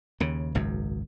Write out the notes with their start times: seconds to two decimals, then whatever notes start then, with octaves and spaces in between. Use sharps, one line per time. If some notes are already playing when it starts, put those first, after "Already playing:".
0.20 D#2 C#3
0.55 G#1 C#2 F#2